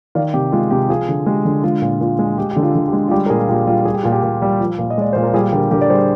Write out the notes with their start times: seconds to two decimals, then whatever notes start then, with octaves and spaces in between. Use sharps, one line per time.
0.15 D#3 D5 F5
0.34 C3 G4
0.52 G#3 F4
0.71 C3 G4
0.89 F3 F4 G#4
1.09 D3
1.26 G#3 G4
1.45 D3
1.64 G#3 F4
1.82 A#2
2.01 A#2 F4
2.19 G#3
2.38 G#3 G4
2.51 G4
2.56 D3
2.62 F4
2.75 D3
2.88 G4
2.93 G#3
3.08 F4
3.11 G3 G4
3.26 A#4
3.30 A#2 F4 G#4
3.49 A#2 G4
3.67 G3 F4
3.85 G3 G#4
3.94 G4
4.03 A#2 F4
4.12 G4
4.23 A#2
4.42 G3
4.60 F3
4.79 A#2
4.90 D#5
4.98 G#3 D5
5.13 A#2 C5
5.23 A#4
5.34 G3 F4 G#4
5.52 D3 G4 A#4
5.71 D3 G4 A#4
5.82 D5
5.90 G3 G#4 C5